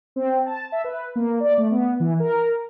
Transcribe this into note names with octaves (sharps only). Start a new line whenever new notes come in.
C4
A5
E5
B4
A#3
D5
A3
B3
E3
A#4